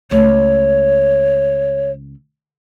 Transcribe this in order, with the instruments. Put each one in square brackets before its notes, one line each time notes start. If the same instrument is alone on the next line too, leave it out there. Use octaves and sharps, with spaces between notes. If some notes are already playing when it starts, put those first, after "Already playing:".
[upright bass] C#2 A3 [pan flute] C#5